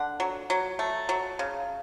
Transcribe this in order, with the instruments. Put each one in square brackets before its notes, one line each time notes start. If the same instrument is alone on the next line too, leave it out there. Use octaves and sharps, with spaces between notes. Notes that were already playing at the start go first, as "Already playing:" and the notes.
Already playing: [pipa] D3 F#5
F#3
F#3
A3
F#3
C#3